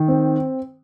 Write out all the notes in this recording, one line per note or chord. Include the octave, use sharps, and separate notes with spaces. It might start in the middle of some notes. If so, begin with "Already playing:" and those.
Already playing: D#3
C4